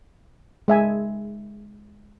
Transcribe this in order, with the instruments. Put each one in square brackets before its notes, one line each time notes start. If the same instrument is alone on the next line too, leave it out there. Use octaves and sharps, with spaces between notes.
[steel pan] G#3 E5 G#5